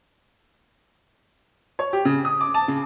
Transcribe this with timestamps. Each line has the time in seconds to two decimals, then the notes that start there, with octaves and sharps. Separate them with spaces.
1.79 C#5
1.93 G4
2.05 C#3
2.25 D#6
2.41 D6
2.54 A5
2.68 C#3